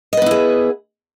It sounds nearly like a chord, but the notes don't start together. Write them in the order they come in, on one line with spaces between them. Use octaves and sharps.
D#5 B4 B3 E4 G#4